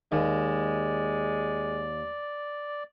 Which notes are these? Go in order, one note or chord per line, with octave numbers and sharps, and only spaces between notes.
D#2 G#3 D5